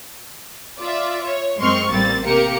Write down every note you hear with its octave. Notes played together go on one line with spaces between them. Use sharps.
F4 D5 E5
C#5
F#2 G#3 C4 C6 C#6 F6
A1 G3 A#3 C4 A6
C3 A#3 G4 A#4 C#7